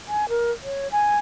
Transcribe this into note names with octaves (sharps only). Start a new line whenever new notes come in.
G#5
A#4
C#5
G#5